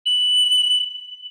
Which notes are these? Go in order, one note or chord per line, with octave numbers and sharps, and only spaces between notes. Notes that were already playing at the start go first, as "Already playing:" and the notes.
F#7